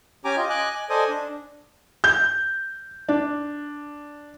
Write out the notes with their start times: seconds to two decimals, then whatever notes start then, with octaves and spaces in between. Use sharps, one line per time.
0.25 C#4 G4 G#5 A#5 D6
0.37 F4 D#5
0.50 D#5 G#5 D6 F#6
0.75 G#5
0.90 A4 C5 D5 D#5 G#5 D#6
1.08 D4
2.04 G6
3.09 D4